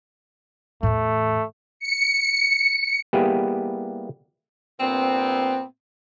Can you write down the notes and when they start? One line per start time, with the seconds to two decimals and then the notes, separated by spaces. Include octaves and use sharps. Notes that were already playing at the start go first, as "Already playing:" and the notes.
0.83 E2 A2 A3
1.80 C#7
3.13 G3 A#3 B3 E4 G4 G#4
4.80 G2 A#2 B3 C4